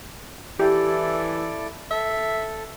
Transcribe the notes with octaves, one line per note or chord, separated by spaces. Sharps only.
E3 E4 G4 A4 D5
A4 E5